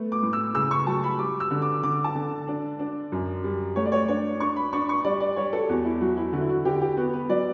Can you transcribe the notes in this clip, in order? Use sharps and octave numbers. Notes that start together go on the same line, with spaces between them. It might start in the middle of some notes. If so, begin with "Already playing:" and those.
Already playing: A3 B3
D6
A2
E6
C#3 E6
C#6
F#3 A5
B5
G3 D6
E6
D3
D6
D3 D6
A5
D3
D4
D4
F#2
G3
A3 C#5
D5
C#5
D4 C#5
D4 C#6
B5
D4 C#6
C#6
G3 D5
D5
G3 C#5
A4
E2 F#4
E4
F#3 F#4
E4
D3 F#4
E4
F#4
D3 G4
G4
B3 F#4
B4
F#3 D5